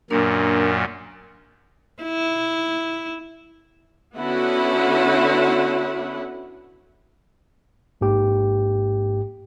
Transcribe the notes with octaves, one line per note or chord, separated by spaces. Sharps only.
F#2 A#2 A#3 D4 A#4
E4
D3 B3 C#4 E4 F#4 F#5
A1 G#2 A#3 G4 G5